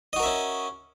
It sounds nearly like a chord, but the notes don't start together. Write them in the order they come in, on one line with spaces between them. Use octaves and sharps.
D#5 F#4 A#4 E5 C#4